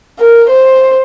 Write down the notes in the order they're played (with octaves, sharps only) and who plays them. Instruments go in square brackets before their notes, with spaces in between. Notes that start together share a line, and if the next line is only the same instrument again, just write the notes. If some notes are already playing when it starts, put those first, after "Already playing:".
[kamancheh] A#4
C5